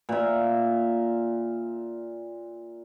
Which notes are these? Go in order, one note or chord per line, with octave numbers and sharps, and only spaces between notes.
A#2 E5